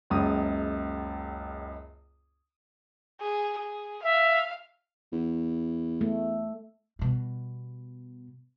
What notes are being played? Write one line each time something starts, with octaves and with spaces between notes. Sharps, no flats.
F#1 C#2 D#6
G#4
G#4
E5 F5
E2
A3
B2 G3